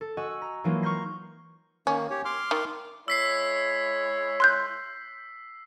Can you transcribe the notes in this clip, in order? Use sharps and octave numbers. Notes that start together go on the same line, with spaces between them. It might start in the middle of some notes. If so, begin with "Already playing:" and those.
A4
F#4 D#5 F#5 G#5 C#6 E6
A#5
E3 F#3 G#3 A#3 D#4 F4
C#6 F6 G6 A#6 C7
D#3 A#3 C#4
G4 C#5
C6 D6 F6
D#3
G#3 E4 C#5 E6 B6 C7
C6 F#6 G6